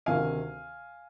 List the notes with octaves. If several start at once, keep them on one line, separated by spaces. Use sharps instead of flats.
D2 C3 D#3 F5 G#5